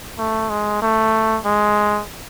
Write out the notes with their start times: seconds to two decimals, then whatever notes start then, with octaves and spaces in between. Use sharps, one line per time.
0.18 A3
0.50 G#3
0.82 A3
1.45 G#3